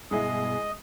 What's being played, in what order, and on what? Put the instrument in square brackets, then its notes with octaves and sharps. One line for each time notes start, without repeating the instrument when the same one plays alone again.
[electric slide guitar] G2 B2 [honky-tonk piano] G#3 E4 G#4 [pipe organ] D#5